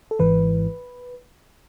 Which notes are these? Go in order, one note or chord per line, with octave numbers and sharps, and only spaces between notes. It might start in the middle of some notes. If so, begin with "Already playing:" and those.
A4
G#1 G#2 E3 B4